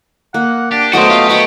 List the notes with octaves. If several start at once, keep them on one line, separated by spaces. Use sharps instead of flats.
A#3 F#5
D4 G4
F#3 A3 B3 F#4 C5 D#5
F4 G4
B3 C5 D#5 C#6